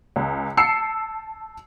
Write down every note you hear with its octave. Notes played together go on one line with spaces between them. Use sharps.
C#2
A5 E6 C7 C#7